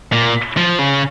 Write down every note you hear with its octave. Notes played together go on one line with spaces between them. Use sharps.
A#2
F3
C#3